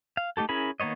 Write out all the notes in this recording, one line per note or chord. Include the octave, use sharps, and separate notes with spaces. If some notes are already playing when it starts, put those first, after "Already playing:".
F5
A3 D#4 G4 A4
C#4 E4 G#4 A#4 B5
D#3 A#3 B3 C#5 D#5